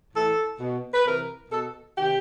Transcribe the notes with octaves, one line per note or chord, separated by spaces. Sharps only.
A2 E3 A4
B2
B4
C3 E3 A#4
B2 A4
C3 D#3 G4